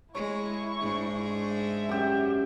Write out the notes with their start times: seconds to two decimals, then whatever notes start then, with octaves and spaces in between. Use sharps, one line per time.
0.15 G#3 E4 C#5 C#6
0.81 G#2 G#3 D4
1.52 E5
1.89 F#2 G4